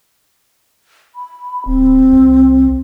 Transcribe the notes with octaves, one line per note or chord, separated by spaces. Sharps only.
B5
D1 C4
C2